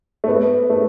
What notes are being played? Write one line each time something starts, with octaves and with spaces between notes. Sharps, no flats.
A3
B3
A3